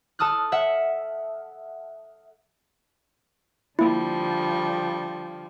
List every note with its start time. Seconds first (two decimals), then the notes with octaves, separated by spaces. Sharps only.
0.19 A4 A5 D#6 F6 F#6
0.52 E5 F#5
3.79 D3 F3 G3 A#3 E4